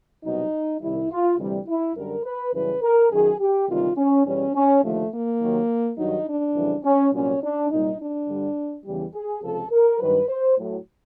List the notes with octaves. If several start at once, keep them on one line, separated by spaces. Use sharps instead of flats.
C2 B2 F#3 D#4
C2 C3 D#3 G3 E4
F4
D2 C3 E3 G3
E4
F#2 D3 G3 A#4
B4
F#2 C#3 E3 G3 B4
A#4
F#2 D#3 F#3 G#4
G4
D2 C3 D#3 G3 F4
C#4
E2 B2 G3 C#4
C#4
D#2 D3 F3 A3
A#3
D#2 D#3 F#3
G2 D#3 F#3 D#4
D4
F2 C#3 E3 G3
C#4
C2 A#2 F#3 C#4
D4
C2 A#2 G3 D#4
D4
G2 D3 G3
E2 C#3 E3 G3
G#4
C#2 C3 F3 A4
A#4
G2 D#3 F#3 B4
C5
A2 F#3